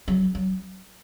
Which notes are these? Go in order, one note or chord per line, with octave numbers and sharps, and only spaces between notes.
F#3
F#3